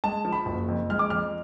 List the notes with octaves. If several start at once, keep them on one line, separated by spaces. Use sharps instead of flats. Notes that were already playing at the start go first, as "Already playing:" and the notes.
G#3 A5
F3
B5
F#1
F2
G#3 F6
D6
F2 F6